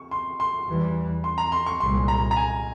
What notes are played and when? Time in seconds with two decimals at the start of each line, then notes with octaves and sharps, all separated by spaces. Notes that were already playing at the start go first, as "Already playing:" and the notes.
Already playing: C#6
0.11 C6
0.40 C6
0.68 E2 E3 G3
1.24 C6
1.38 A#5
1.52 C6
1.66 C#6
1.80 C2 A#2 G#3 C6
2.08 A#5
2.31 A#5
2.36 G#5